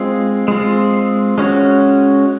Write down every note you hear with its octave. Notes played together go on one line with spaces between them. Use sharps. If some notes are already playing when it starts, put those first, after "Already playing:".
Already playing: G#3 C4 F4
G#3 C4 F4
G#3 C#4 F#4 C#5